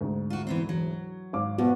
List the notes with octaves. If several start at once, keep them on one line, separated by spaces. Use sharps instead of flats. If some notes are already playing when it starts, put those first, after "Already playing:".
D2 G#2
F4 F#4
E3 B3 C4
F#3
G#1 F5 D6
B2 B3 F#4